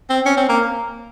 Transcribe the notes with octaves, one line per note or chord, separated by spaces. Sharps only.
C4
C#4
C4
A#3